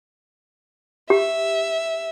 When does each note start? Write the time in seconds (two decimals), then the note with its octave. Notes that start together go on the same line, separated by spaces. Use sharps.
1.10 G4 E5